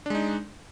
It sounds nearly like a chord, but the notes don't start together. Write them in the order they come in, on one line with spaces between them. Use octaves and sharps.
D4 G#3 D#4